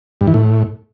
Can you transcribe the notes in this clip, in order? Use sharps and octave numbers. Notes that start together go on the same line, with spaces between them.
G2
E3
A2